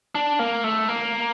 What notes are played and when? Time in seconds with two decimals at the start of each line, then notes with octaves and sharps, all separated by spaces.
0.15 D4
0.39 A#3
0.64 A3
0.89 A#3